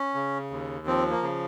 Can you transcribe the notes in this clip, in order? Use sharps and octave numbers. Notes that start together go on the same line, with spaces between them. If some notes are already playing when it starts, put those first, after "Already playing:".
Already playing: C#4
C#3
D#2
F3 C4
A#3
C#3